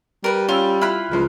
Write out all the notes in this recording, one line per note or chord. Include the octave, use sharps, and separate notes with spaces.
G3 A#4 B4
C#4 F4 E6
E4 F4 B5 F6 F#6
C#2 F3 G#3